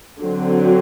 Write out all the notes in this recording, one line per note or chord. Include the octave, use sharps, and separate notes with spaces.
D3 F#3 C4